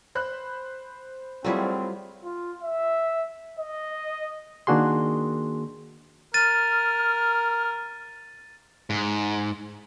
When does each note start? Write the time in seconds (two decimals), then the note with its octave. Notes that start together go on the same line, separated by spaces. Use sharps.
0.15 C5 B5 F#6
1.44 F#3 G3 A3 C4 E4 F4 G#4
2.24 F4
2.62 E5
3.59 D#5
4.67 D#3 A#3 D4 F#4 G#4 C6
6.34 A#4 F6 A6 D#7
8.90 G#2